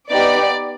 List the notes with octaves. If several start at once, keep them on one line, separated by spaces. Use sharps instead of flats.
B3 D#4 G4 D5